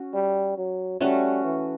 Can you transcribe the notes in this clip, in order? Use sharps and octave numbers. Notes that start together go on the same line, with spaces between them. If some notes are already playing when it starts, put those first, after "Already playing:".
Already playing: C#4 F#4
G3
F#3
G3 A3 C#4 F#4
E3